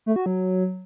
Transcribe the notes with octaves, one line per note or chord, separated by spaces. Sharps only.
A3
F#4
F#3